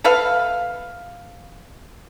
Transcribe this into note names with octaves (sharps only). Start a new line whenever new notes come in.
A4 B4 E5 F5